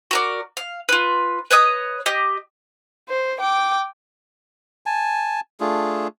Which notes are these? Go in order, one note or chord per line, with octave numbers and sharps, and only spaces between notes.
F#4 A#4 D5
F5
F4 B4
B4 C#5 D#5 D#6
G4 D#5
C5
G5 D6
G#5 A5
A3 D4 F4 G#4